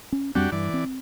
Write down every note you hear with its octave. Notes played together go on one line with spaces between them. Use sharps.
C#4
F2 G3 C4 D4 F#4 G4
G2 E3 D5
C4